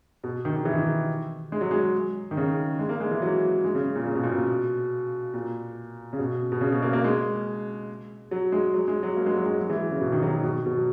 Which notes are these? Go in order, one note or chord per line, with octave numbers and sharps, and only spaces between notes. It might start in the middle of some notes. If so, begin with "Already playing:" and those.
B2
D#3
D#3
E3
D#3
G#3
F#3
G#3
D#3
C#3
G#3
A#3
G#3
E3
F#3
G#3
C#3
A#2
C#3
B2
A#2
B2
A#2
C#3
B2
B2
C#3
B2
A#3
A#3
G#3
F#3
G#3
F#3
G#3
F#3
A#3
G#3
F#3
G#3
F#3
E3
C#3
B2
D#3
F#3
F#3
B2
B2
F#3